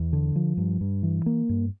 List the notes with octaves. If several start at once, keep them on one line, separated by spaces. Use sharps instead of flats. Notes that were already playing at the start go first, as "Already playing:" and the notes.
Already playing: E2
D3
F3
G2
G2
E3
A#3
G2